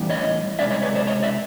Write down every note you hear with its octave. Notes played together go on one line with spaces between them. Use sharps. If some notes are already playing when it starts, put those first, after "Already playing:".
Already playing: A2 E3 G3
C#5 D#5
C3 D#3 G#3 D5 E5
C#5 D#5
B4 C#5
C5 D5
C#5 D#5
D5 E5